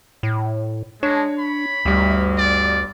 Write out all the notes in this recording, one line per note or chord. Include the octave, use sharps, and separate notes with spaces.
A2
G#3 D4 C#5
B5
G1 D2 G3
D5